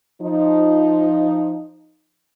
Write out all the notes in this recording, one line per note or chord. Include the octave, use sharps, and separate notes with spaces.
F3 D#4